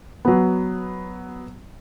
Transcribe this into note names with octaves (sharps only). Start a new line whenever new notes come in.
F#3 B3